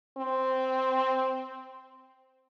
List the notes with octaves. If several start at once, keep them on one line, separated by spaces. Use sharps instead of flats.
C4